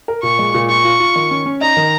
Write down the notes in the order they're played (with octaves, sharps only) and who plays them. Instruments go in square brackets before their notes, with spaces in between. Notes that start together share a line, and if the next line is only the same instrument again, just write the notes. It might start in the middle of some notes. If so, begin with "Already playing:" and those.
[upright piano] A#4
[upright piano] A#2 [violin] C#6
[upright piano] G#3
A#2
[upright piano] F4 [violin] C#6
[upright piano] F4
F4
D#3
C#4
C#4
[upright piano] D#4 [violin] A#5
[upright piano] D#3